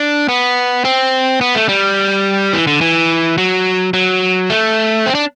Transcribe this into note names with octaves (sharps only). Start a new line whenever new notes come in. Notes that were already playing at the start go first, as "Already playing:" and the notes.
Already playing: D4
B3
C4
B3
A3
G3
E3
D3
E3
F#3
F#3
A3
C4
D4